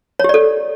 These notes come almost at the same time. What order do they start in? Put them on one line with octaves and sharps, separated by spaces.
C#5 G4 D5 A4